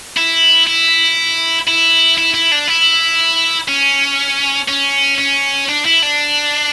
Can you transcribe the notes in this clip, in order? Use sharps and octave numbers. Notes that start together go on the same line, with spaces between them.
E4
E4
E4
E4
E4
D4
E4
C#4
C#4
C#4
D4
E4
D4